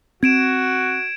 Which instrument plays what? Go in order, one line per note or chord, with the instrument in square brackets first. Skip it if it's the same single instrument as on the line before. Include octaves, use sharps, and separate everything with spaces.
[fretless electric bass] C4 [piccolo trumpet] F#4 [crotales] G#6 D7 E7